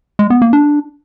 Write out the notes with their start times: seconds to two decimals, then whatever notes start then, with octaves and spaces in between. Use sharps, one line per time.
0.19 G#3
0.30 B3
0.42 A#3
0.53 D4